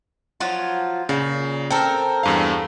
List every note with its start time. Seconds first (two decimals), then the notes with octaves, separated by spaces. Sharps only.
0.40 F3 F#3 F4
1.09 A#2 C#3
1.70 C4 A4 A#4 G5
2.23 E2 G2 F5